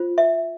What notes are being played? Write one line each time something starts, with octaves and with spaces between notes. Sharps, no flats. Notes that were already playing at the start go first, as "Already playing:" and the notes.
Already playing: F4 C5
E5